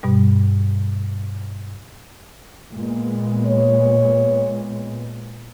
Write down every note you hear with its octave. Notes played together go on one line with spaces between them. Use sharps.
G2 B2 G3
A#2 G#3 B3
C#5